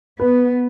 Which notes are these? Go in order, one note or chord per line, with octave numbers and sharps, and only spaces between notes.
B3 B4